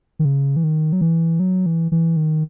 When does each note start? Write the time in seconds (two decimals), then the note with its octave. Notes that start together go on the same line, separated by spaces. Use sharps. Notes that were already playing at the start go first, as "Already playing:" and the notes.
0.19 D#3
0.25 C#3
0.56 E3
0.64 D#3
0.93 F#3
1.01 E3
1.40 F#3
1.66 E3
1.92 E3
2.17 D#3